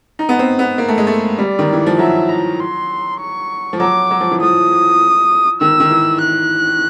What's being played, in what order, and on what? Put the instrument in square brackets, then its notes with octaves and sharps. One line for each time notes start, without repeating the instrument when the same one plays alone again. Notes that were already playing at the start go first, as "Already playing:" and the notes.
[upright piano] D#4
B3
C4
B3
A#3
A3
G#3
A3
[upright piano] G3 [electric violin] D5
[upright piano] D#3
E3
F3
[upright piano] F#3 [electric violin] E5
[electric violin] A#5
C6
C#6
[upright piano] F3
[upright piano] F#3 [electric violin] D6
[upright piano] F#3
F3
E3
[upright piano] F3 [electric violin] D#6
[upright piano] D#3 [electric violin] E6
[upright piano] D#3
E3
[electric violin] F#6